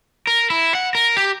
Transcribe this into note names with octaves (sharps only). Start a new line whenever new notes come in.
A#4
E4
F#5
A#4
G4